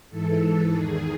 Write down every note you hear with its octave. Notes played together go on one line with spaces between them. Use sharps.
G#2 E3 A4
E2 D#3 G#4